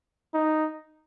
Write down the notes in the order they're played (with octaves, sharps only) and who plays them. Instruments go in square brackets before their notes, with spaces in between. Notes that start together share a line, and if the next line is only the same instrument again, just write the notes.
[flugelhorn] D#4